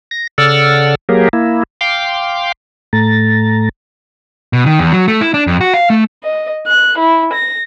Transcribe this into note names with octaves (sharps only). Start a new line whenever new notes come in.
A#6
C#3 A4 D5 F#5 E6 F6
F#3 A#3 G4 G#4 A#4
A#3 E4
F5 G5 C6 D6
A2 A3 A#5 A6
B2
D#3
E2
F#3
A3
E4
D4
F2
F#4
F5
A3
D#5
F#6
E4
A#6